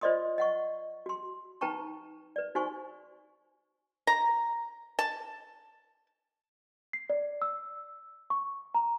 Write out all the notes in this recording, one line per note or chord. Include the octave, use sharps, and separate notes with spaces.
F4 C5 D5 D#5 C6 D#6
D#5 F#5 C#6
F#4 C6
D#4 B4 G5 A5 A#5 C#6
B4 D5
D#4 F#4 C5 G#5 C#6
A#5
A5
C7
D5
E6
C#6
A#5